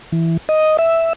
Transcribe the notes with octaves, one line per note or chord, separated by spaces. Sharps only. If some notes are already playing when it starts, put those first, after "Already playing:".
E3
D#5
E5